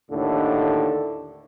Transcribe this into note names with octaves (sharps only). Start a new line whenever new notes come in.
D#2 A2 D3